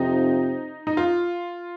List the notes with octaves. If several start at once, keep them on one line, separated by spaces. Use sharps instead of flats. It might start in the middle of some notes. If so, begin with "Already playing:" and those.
Already playing: F2 C3 F3 C4 D#4
D#4
F4